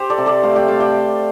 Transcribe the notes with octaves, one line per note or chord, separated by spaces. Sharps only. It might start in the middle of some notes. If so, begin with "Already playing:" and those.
Already playing: G4 C5
A4 D5
C3
A4 D5
A3 C5 F5
D5 G5
A3 F5 A5
D5 G5